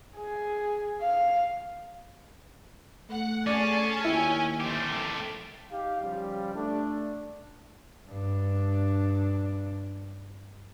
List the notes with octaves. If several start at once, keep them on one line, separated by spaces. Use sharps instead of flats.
G#4
F5
A3 F#5
C#4 G#4 D5 A5
D#2 E4 E5 G5 G#5
A3 G4 C5
D#4 G4 F5
C#3 F3 G3
A3 D4
G2 D4